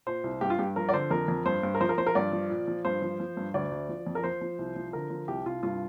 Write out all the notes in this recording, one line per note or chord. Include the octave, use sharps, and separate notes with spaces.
A#2 C5
C2
G2 G4
F4
G2 G4
F3 A#4
D5
D3 C5
F2 A#4
F2
G2 C5
G2
A#4
F3 C5
A#4
F3 C5
A#4
G2 D5
F3
A#2
F3
G2 C5
F3
F3
G2
D2 D5
D2
F3
F2
A#4
F3 C5
F3
C2
F3
D3 A#4
F3
C2 G4
C2 F4
G2 F4